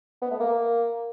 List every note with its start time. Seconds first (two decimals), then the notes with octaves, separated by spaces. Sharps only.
0.22 B3
0.31 A3
0.40 A#3